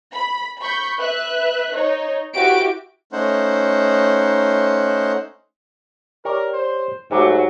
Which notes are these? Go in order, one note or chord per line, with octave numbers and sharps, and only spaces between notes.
B5
B5 C#6 G6
B4 E5 F#6
D#4 C#5
E4 F#4 G4 D6 D7
A3 C#4 D#4 C5 F#5
G4 A#4 C#5 D5
C5
G#2 F#3 A3 D#4 G4